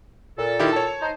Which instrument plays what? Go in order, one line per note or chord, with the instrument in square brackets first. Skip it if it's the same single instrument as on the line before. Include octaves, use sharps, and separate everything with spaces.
[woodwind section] A#2 A4
[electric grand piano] D#3 E4 G4
C#5 A5
[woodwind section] D#4 C5